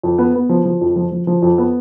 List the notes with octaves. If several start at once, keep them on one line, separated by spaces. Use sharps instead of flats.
F2
B3
B3
F3
F3
F2
F3
F3
F3
F2
B3